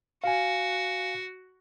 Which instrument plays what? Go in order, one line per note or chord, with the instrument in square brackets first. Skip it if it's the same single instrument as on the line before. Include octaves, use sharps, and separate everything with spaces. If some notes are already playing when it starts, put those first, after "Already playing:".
[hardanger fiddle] F#4 [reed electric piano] F5 G#5